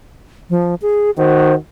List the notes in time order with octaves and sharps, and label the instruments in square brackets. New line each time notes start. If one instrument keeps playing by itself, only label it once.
[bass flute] F3
G#4
[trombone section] D#3 F#4 [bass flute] C5